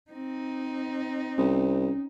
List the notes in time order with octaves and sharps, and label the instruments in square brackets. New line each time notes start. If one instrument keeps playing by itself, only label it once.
[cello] C4 D#4
[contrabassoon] C2 [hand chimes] C#4